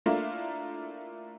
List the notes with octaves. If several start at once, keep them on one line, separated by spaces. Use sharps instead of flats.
A3 A#3 D4 E4 F4